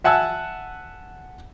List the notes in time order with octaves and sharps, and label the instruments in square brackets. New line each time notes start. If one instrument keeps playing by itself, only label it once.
[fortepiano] E5 F#5 G#5 A5 E6